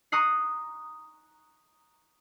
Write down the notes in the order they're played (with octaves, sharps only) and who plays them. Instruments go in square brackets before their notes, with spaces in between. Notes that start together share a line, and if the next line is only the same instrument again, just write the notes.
[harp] A#5 C#6 D#6 F#6 C7